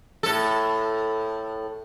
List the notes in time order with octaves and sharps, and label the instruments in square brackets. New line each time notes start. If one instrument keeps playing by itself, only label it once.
[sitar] A2 A4